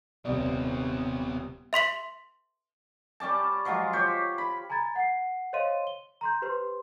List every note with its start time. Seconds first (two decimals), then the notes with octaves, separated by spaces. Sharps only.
0.25 D#1 C3 B3 D#4 D5
1.73 E5 C6 B6 F#7
3.20 G3 C#4 D5 A5
3.65 F3 F#3 G#3 F4
3.93 G4 C5 C#5
4.38 B5
4.70 G#5 A#5 B5 G#6 A6
4.96 F#5 C7
5.53 C5 C#5 D#5 F5 C6 D#7
5.87 G7
6.21 A#5 C6 G6
6.42 G4 B4 C5 C6